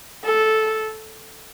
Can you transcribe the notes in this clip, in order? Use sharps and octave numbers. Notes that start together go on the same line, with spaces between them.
A4